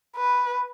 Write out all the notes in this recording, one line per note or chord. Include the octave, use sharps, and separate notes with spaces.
B4